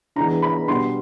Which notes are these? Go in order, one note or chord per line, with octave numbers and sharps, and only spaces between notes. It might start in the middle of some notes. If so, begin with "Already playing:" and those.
E3 G#3 B3 D4 A#5
B5
B2 G3 B3 D4 C6